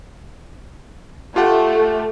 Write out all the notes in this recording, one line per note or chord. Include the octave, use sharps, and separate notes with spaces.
A3 F4 G4 F#5